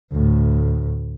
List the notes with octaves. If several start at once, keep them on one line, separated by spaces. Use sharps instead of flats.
D2 A2